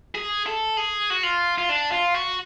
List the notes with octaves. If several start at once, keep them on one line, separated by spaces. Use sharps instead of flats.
G#4
A4
G#4
F#4
F4
F4
D4
F4
F#4